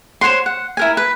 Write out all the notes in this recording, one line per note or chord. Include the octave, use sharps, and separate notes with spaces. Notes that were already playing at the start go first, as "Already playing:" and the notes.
C5 C#5 F#5 C6
F#5
E4 A#4 G#5
B4